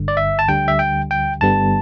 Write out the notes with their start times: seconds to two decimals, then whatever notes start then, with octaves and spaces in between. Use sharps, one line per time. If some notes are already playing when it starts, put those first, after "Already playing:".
Already playing: G1 G2 D3
0.08 D5
0.17 E5
0.39 A5
0.48 D2 D3 G3 G5
0.68 E5
0.79 G5
1.11 G5
1.41 G1 G2 D3 G3 B3 A5